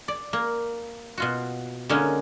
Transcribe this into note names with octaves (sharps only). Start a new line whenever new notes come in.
D5
A#3
B2 F4 F#4
D3 G#3 A#3 C#4 D#4